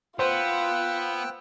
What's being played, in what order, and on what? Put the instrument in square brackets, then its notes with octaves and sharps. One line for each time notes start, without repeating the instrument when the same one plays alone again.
[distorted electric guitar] B3 [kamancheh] F4 [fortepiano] C5 [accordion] G5 E6 F#6